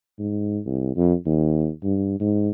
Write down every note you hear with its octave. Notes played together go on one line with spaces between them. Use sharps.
G#2
C2
F2
D#2
G2
G#2